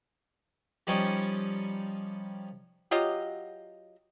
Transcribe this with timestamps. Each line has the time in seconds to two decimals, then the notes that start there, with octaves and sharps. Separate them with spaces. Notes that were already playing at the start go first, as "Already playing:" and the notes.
0.87 F3 G3 C#4 D#4 G4 C#5
2.91 F#3 F4 G4 D#5